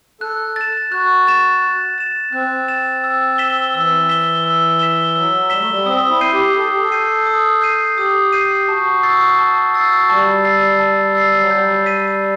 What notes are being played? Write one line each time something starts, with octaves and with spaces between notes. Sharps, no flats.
A4 F#6
A6 E7
F#4 F#6
A6 E7
F#6
A6 E7
C4 F#6
A6 E7
E6
B6 E7 G7
E3 E6
B6 E7 G7
E6
B6 E7 G7
F#3 E6
G3 B6 E7 G7
A3
G3
C4 D#6
E4
G6 C7 D#7
G4
A4 D#6
G4
A4
G6 C7 D#7
D#6
G6 C7 D#7
G4 D#6
G6 C7 D#7
F#4 A5
E6 A6 C7
A5
E6 A6 C7
G3 A5
E6 A6 C7
A5
E6 A6 C7
F#3
G3 G6
B6 D#7